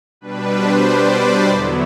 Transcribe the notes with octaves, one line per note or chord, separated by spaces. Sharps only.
B2 G3 D4 B4
C5
D5
E2 D3 F#3 B3 E4